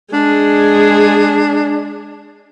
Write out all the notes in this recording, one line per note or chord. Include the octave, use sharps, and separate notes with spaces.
G#3 D4 G#4